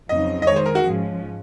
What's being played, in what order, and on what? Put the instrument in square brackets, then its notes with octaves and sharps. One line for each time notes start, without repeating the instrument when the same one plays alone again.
[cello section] F2 C#3 F#3 C4 D#4 [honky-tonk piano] D#5
[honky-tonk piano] D#5
[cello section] D#3 G#3 D#4 G#4 [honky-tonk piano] C#5
[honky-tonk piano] C5
A#4
F#4
[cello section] G#2 F3 G#3 C#4